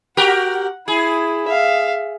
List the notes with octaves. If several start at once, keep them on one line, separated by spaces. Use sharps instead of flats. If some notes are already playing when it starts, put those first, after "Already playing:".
F#4 G4 A#4 F#5
E4 G#4
E5 F5